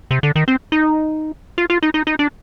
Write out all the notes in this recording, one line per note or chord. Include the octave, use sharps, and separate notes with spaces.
C3
D3
D#3
C4
D#4
F4
F4
D#4
D#4
D#4
D4